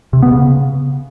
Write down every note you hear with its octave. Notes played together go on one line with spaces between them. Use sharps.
C3
B3
C#3